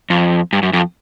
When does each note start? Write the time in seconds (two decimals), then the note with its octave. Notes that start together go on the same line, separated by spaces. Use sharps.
0.10 F2
0.53 G2
0.63 F#2
0.73 F2